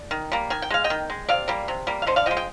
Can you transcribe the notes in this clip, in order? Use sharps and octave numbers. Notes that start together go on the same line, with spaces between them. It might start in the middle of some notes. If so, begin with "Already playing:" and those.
Already playing: D5
D#3
G3 A#3
D#3 G#5
G5
G#3 F5
D#5 G5
D#3
G#3
C3 D5 F5
G3 A#3
C3
G3 A#3
F5
D3 C5 D#5
D5 F5
F3 G#3 D#5 G5
D#5 G5